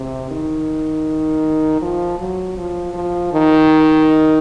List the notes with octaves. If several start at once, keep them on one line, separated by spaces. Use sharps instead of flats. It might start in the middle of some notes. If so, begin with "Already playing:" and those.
Already playing: C3
D#3
F3
F#3
F3
F3
D#3